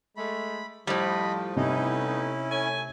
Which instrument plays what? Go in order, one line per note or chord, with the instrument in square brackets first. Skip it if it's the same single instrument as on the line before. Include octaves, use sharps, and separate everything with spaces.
[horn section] G#3 A3 [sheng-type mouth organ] B5
[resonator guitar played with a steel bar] A2 G3 [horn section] F3 [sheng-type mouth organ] D#5 B5
[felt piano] C3 [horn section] A3 B3 D#4 [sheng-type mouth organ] C#4 E4
[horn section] A3 C#5 G#5